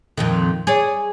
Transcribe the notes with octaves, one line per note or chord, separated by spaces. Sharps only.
F2 A#2 D#3
G#4 C#5 D5